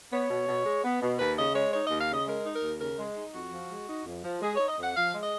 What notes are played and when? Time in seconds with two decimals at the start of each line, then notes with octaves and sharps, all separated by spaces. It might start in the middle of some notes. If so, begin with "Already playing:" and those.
0.12 B3 C#5
0.29 B2
0.48 B2
0.66 G#3
0.84 B3
1.02 B2
1.19 D#2 B4
1.37 C#3 D#5
1.55 G#3 C#5
1.73 D#4 C#5
1.86 D#2 D#5
1.99 F5
2.09 C#3 D#5
2.26 G#3 A#4
2.45 D#4
2.53 A#4
2.63 D#2
2.80 C#3 A#4
2.98 G#3
3.16 D#4
3.34 F2 F#4
3.52 F3
3.70 G#3
3.88 D#4
4.05 F2
4.24 F3
4.42 G#3 G#4
4.55 D#4 C#5
4.68 D#5
4.77 F2 F#5
4.95 F3 F5
5.13 G#3
5.22 D#5